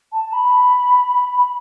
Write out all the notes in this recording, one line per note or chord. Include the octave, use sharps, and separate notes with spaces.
A5
B5